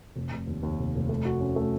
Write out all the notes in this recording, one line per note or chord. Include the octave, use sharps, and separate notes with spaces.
F1
F1
D#2
D#2
F1
F1
A3
F#4
C#4
A3